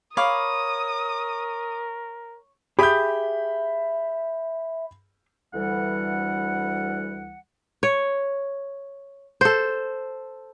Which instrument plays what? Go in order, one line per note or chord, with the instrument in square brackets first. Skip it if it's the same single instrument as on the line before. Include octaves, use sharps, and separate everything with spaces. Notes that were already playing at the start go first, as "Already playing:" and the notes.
[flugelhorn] A#4 [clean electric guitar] C#5 [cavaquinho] F5 B5 D6 [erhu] D#6
[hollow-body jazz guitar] G4 G#4 [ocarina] E5 [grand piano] B5 G6
[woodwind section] D2 E3 G3 F#5
[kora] C#5
A4 C5